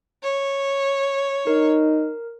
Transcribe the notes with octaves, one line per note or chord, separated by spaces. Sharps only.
C#5
D#4 A#4